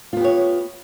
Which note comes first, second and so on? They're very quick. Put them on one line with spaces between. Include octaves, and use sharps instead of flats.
F4 B3 G4 C#5